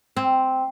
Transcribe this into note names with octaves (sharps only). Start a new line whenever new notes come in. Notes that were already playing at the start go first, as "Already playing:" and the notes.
C4